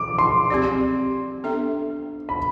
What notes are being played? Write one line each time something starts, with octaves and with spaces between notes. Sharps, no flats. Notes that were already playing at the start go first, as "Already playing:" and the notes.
Already playing: F3 D6
C6
C4 G4 D5
B3 D4 A4 E5
B5